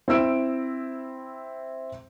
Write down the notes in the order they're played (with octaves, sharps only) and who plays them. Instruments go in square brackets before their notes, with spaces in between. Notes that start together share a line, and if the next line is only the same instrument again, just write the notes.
[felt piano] C4 E4 E6 D7